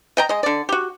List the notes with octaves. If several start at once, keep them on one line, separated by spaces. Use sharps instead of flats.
D#5 G5 A#5
G#3 D#5
D3 D5
F#4 G4